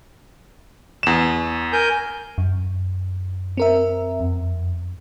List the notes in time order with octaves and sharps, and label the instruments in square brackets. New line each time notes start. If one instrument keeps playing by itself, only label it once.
[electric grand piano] E2 E7
[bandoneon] A#4 G#5 G6
[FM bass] F#2
[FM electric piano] C4 A#4 E5
F2